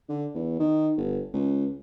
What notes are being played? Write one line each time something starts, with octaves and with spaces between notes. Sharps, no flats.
D3
E2
D#3
G1
C#2